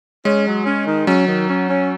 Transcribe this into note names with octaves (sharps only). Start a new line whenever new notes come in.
G#3 C#4
F#3
C#4
D#3
F#3 C#4
D#3
C#4
C#4